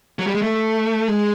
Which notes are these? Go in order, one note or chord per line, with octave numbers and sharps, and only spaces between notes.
F#3
G3
G#3
A3
G#3